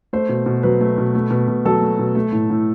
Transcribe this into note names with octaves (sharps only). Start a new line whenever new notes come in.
A3 C5
B2
B2
F#3 B4
A3
B2
A3
B2
B2
F#3 A4
A3
B2
A3
A2
A2